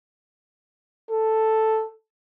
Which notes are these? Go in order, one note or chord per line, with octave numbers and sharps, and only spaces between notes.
A4